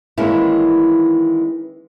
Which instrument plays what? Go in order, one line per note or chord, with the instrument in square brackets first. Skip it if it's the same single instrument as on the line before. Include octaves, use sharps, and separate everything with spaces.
[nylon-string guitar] D#3 E3 G#3 A#3 C#4 E4